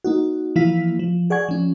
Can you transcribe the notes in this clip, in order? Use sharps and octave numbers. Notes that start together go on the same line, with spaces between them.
A#3 D#4 F#4
E3 F3 A#3 E4 F5 B6
F3
G#4 D5 F#5 G#5 C#6 G#6
F3 C#4